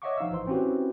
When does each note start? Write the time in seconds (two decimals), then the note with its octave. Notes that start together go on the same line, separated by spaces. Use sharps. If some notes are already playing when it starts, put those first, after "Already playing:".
0.02 C#5 D#5 E5 F#5 C#6 D6
0.18 F3 D#4 F5 E6
0.31 A1 E3 C5 C6
0.47 C4 C#4 E4 F#4 G4 B4